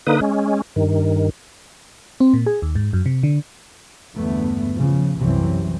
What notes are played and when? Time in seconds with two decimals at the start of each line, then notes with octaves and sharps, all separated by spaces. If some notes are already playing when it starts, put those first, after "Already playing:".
0.07 D3 A#3 D#4 B4 D#6
0.21 G#3 C#4
0.76 G2 D#3
2.20 C4
2.33 A#2
2.46 G#4
2.62 D#2
2.75 G#2
2.93 F#2
3.06 C3
3.23 D3
4.14 G1 E2 D3 A3 B3
4.74 C#3 F3
5.17 C2 F#2 C3 E3 F#3 C4